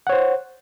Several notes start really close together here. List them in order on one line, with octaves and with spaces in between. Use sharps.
F#5 C#5 C5